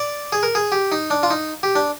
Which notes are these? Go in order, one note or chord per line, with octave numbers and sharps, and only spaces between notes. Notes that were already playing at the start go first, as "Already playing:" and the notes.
Already playing: D5
G#4
A#4
G#4
G4
D#4
D4
F4
D#4
G4
D4